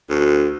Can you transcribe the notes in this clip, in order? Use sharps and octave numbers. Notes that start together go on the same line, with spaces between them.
D2